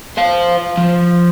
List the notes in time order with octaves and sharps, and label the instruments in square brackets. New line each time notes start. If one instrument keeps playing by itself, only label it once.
[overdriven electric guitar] C5 F5
F3